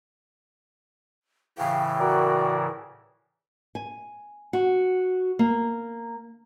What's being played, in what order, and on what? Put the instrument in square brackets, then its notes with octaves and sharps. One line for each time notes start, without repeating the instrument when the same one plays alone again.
[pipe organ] A2 C#3 E3 [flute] F5 [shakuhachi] G5
[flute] F#4 [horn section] A#4 D5 A#5
[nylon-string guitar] G#5
F#4
A#3